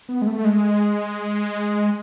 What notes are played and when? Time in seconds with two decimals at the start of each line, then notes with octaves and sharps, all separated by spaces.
0.09 B3
0.22 G#3
0.27 A3
0.45 G#3